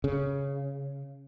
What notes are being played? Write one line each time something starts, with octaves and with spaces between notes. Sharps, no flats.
C#3